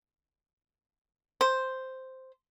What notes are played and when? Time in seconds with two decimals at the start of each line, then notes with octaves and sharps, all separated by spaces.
1.41 C5